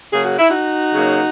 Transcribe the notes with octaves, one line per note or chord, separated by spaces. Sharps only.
C#3 F#3 A#3 G#4
F#4
E4
D#4 F#4
C#3 F#3 A#3